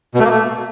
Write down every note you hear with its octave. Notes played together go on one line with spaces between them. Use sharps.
B2
A3
A#3
A3